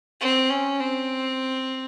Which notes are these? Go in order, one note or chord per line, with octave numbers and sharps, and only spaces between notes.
C4
C#4
C4